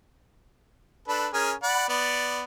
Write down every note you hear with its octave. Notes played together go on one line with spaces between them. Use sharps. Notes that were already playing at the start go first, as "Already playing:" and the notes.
D4 A4 B4
C#4 G#4 A#4
D5 F#5 B5
B3 D5